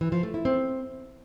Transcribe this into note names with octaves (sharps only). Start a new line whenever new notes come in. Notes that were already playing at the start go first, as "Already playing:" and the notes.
E3
F3
A3
E4
C4